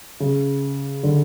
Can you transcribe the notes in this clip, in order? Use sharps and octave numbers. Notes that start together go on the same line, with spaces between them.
C#3
D3